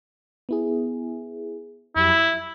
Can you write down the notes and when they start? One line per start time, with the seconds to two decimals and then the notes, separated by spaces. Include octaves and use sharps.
0.49 B3 E4 G#4
1.96 F2 F#3 E4 G4
2.10 B5